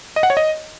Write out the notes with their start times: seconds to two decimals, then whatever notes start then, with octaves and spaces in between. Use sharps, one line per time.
0.16 D#5
0.23 F#5
0.30 C#5
0.37 D#5